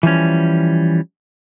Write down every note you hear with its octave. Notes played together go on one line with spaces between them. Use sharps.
E3 F3 G3 C#4